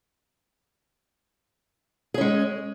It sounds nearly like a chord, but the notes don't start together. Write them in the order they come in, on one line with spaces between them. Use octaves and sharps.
G#4 C#4 G#3